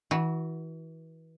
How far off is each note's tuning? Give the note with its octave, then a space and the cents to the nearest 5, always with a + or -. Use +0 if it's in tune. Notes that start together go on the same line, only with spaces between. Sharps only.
E3 -30 F#4 +0